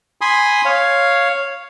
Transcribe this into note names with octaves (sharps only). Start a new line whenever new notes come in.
G#5 B5 C6 D#6
C#5 F5